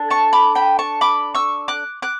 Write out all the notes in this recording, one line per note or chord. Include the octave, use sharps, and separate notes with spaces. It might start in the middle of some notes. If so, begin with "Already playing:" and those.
Already playing: D4 A4
A5 C#6
B5 D6
G5 B5
A5 C#6
B5 D6
C#6 E6
D6 F#6
D6 F#6